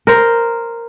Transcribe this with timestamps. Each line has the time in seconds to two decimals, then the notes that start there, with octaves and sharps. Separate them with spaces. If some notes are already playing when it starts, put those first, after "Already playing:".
0.07 A#4 C5